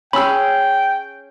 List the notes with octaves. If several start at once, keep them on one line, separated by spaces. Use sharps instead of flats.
C#4 G#4 G5 B5 E6